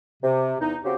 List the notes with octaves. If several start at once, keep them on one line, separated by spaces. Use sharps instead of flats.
C3
E2 D#4
C#3 C4 F#4 G4